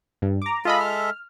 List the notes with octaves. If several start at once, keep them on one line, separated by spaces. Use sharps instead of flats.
G2
A#5 D6
G#3 F4 A4 D#5 E5 B5
F6